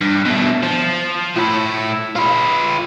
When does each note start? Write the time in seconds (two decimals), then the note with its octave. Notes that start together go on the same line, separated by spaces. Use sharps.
0.01 G2
0.25 B2 A3
0.63 F3
1.36 A2 E4
2.16 F4 B4